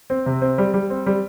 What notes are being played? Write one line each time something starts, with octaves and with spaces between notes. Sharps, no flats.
C4
C3
C4
G3
G3
C4
G3